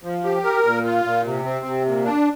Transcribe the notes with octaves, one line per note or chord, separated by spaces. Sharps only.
F3
G4
A#4
A#2
F4
A#2
C3
C4
C3
A#2
D4